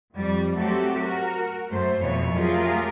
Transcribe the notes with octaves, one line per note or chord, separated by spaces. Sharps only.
F2 G3
F#3 A3 C4 F#4 G4 A4
F#4 A#4
F#2 A3 C5
F2 B2 E3 F#3 C#5
F#3 A3 F4 G4 G#4 A#4